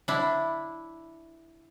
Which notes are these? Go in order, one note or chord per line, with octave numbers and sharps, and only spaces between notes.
D4 E4